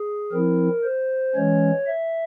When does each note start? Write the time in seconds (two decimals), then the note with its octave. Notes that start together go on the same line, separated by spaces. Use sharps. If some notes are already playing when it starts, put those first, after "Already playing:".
Already playing: G#4
0.32 F3 C4 E4 A#4
0.84 C5
1.35 E3 G#3 C#4 C#5
1.87 E5